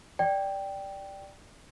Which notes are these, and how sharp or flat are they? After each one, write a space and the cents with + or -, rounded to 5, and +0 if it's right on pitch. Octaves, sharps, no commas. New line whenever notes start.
D5 +0 G5 +0